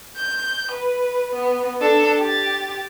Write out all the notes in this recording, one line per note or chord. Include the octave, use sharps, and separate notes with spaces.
G6
B4
B3
D4 A4
G4 A6